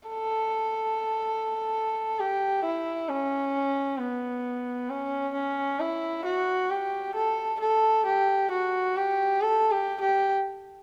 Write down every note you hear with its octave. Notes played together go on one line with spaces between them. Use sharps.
A4
G4
E4
C#4
B3
C#4
C#4
E4
F#4
G4
A4
A4
G4
F#4
G4
A4
G4
G4